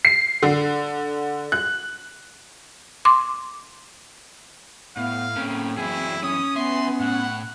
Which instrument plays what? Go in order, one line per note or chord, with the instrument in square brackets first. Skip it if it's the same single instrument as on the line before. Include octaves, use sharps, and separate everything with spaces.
[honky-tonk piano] C7
D3
F#6
[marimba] C6 D6
[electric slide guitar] A2 [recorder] B3 [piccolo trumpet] F5
[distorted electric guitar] A2 [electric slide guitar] A#3 C#4 A#4 [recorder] C4
[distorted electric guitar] F#2 E3 [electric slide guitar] F#3 G#4 [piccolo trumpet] E4
[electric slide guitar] C#4 [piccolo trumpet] D#6
[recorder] B3 [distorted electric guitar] B4 E5 [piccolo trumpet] C6
[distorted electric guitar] A2 [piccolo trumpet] F#5